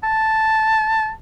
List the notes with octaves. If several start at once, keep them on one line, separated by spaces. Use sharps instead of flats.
A5